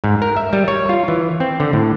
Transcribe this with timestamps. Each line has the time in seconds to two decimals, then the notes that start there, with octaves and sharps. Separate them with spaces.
0.04 G#2
0.22 A#4
0.37 E5
0.53 G3
0.68 C#5
0.89 F4
1.08 E3
1.40 C4
1.60 D3
1.73 A2